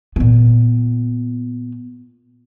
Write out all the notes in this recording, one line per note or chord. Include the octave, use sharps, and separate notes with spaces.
A#2 B3